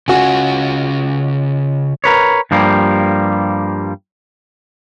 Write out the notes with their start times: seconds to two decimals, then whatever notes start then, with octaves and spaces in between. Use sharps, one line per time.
0.08 C#3 C#4 F4 F#4 G#5
2.04 A#4 B4 C#5
2.51 G2 F3 G3 A#3